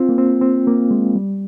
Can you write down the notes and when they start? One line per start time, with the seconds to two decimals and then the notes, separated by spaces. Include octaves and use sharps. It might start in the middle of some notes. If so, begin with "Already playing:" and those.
Already playing: C4 F4
0.09 A#3
0.18 C4
0.41 C4
0.67 A#3
0.91 G#3
1.15 G3